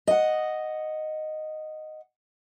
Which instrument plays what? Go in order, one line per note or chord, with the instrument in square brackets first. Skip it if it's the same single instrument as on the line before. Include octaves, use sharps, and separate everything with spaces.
[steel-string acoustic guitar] D#5 F#5